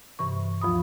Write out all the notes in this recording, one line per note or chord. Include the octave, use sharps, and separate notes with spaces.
G2 C3 E3 C#6
D2 F3 F4 B5 D#6